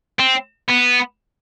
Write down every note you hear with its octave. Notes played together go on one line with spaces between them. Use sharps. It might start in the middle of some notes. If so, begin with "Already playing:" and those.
C4
B3